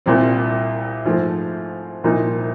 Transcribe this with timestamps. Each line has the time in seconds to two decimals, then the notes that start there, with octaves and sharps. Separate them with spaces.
0.06 C2 A#2 G3 C4
1.05 G#2 F3 A3
2.04 C2 A#2 F3 A#3 D#4